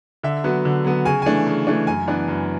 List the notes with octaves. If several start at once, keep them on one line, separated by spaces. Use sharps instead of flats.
D3 E5
F#3 B3
D3
F#3 B3
C#3 G#5
E3 A3 D4 G#5
C#3
E3 A3 D4
F#2 G#5
E3 B3 D4
F#2